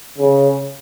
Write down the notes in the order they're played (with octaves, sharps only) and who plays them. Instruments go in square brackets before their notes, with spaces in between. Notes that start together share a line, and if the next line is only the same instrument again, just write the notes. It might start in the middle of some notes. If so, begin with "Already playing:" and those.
[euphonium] C#3